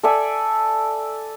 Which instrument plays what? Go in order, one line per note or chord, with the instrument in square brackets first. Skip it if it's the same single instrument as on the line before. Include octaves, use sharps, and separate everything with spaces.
[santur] A4 D5 E5 G#5